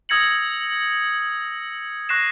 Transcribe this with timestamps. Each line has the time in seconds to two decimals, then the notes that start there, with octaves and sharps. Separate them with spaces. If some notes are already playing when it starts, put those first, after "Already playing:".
0.09 D#6 E6 G#6 A#6 C#7 F#7
2.09 C#6 F#6 A#6 C7 E7